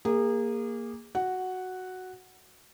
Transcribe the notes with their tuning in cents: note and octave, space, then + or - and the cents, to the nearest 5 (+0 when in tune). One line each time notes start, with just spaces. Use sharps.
A#3 +0 G#4 -30
F#4 +0 F#5 +0